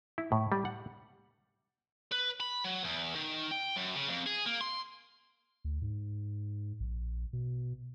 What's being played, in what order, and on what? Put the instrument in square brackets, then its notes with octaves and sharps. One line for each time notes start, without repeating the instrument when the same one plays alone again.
[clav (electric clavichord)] E4
A2
G3
F#5
[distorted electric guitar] B4
B5
F#3
E2
D#3
G5
F#2
C#3
F2
G#4
A#3
C6
[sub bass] D2
G#2
A#1
B2